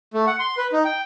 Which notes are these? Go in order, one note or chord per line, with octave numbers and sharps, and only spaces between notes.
A3
F#5
C6
B4
D#4
G5